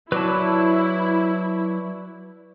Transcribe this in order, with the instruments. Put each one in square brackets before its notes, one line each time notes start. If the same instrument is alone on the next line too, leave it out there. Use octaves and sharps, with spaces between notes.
[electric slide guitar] F#3 [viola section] E4 [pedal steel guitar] B4 D5 A5